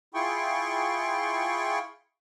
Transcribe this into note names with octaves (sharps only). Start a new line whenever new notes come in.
E4 F4 G#4 G5 C6 C#6